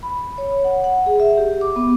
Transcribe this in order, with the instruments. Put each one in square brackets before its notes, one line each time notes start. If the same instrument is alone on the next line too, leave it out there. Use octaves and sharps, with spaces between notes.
[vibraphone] B5
C#5
F#5
F#5
G#4
E5
G4
D6
B3